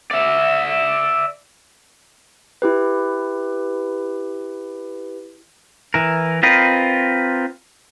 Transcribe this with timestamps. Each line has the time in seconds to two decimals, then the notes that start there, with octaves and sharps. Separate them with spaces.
0.11 D5 E5
2.62 E4 G4 B4
5.94 E3 A#4
6.43 C4 F4 A#4 B4 D#5